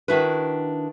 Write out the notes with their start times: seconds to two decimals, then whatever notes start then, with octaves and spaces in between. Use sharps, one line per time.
0.08 D#3 D4 E4 F#4 B4